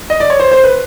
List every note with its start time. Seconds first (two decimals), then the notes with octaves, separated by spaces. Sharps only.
0.10 D#5
0.20 D5
0.30 C#5
0.40 C5
0.52 C5
0.64 B4